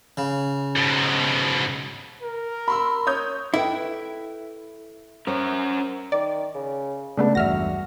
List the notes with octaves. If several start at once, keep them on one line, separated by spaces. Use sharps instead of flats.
C#3
G#2 B2
A#4
B5 C6 E6
C#5 D#6 G6
E4 A4 B4 G5
C#4 A#4 C5 C#5
D#3 D5
C#3
C#3 G#3 A3 B3 D4
A1 E2 G2 F#4 E5 F6 A#6